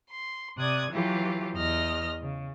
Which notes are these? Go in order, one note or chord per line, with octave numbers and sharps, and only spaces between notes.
C6
C3 D5 D#6 F#6 G#6
E3 F#3 F4 G4
E2 D#5 F6 A#6
C#3